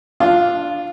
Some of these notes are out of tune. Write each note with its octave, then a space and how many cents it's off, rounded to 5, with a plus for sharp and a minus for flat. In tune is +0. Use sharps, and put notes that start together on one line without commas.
D4 +0 F4 +0 F5 +0